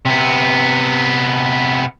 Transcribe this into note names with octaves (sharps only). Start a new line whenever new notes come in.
C3 B3